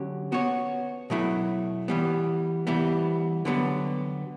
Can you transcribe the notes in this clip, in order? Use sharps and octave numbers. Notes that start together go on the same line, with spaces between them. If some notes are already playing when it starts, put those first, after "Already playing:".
Already playing: D3 F#3 C#4 G4
B3 F#4 C#5
B2 F#3 A3 E4
E3 G3 B3
E3 G3 B3
D3 F#3 B3